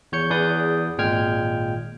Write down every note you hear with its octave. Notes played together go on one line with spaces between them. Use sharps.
E2 C#5 G6 C#7
E2 G#4 B4 D5 D#6 G6
G#1 A#2 G#3 G5 F6 G#6